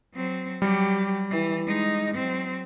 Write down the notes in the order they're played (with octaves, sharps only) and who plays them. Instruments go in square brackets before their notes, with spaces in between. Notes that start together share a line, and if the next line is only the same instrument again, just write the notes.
[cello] F#3 C4
[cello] F#3 G4 [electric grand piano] G3
[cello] E3
G#3 D#4
F#3 C4